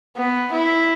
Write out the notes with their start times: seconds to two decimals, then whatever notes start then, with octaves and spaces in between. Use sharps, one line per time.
0.17 B3
0.53 E4